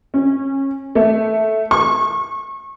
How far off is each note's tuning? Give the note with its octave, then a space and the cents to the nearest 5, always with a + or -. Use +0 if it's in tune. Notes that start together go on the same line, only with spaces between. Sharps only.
C#4 -25
A3 -5
C#6 -20